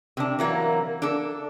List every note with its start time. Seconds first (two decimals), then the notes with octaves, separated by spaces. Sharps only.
0.17 C3 D4
0.39 E3 F#3 A#3
1.02 D4 A4